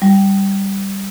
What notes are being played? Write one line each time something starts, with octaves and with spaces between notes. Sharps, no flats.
G3